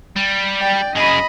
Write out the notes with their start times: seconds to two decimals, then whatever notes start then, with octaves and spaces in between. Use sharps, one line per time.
0.16 G3
0.61 D5 G5
0.95 F#2 G#4 D#5 B5